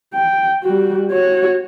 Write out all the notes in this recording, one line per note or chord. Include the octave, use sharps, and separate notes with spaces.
G5
G3 F#4
F#4 C#5